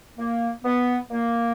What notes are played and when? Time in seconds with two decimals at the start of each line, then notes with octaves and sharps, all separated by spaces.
0.17 A#3
0.63 B3
1.09 A#3